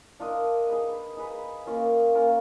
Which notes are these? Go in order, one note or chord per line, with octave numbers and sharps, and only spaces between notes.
D4 F4 A#4 D#5
D#4 G#4 B4 D#5
D#4 G#4 B4 D#5
A#3 C#4 F4 A#4
A#3 C#4 F4 A#4